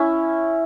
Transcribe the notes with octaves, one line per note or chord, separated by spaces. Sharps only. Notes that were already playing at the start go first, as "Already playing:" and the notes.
Already playing: C#4 E4